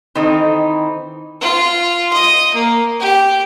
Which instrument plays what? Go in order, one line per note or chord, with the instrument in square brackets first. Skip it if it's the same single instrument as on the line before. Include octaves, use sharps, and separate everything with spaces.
[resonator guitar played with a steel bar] D#3 E3 C4 D#4 A4
[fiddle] F4
D#5
A#3
G4